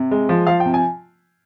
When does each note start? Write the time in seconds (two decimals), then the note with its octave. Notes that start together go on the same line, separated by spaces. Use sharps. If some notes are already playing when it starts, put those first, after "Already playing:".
Already playing: C3
0.11 G#3
0.29 F3
0.47 F3 F5
0.60 G5
0.66 C3
0.74 G#5